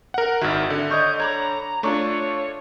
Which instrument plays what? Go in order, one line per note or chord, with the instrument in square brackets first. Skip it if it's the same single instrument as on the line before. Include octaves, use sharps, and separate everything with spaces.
[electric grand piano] A#4 F#5
[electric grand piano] G#1 D#3 [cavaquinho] E4 F#4 E5
[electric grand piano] D3
[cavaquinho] C#5 D#5 C#6 [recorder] G6
[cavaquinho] C#5 B5 D6 [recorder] A#5
[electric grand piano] A3 D4 F4 [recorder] C#5 [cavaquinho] C#6 D6